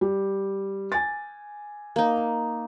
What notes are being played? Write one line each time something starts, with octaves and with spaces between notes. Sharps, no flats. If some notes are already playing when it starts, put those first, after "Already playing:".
G3
G#5 A6
A#3 D#4